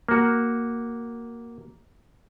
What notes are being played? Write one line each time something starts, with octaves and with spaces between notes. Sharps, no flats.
A#3 F#4